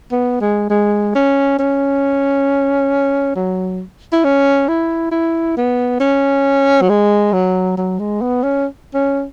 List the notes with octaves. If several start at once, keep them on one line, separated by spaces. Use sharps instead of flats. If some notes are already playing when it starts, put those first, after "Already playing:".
B3
G#3
G#3
C#4
C#4
F#3
E4
C#4
E4
E4
B3
C#4
F#3
G#3
F#3
F#3
G#3
B3
C#4
C#4